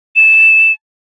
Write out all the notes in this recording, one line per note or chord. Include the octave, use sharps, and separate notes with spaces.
E7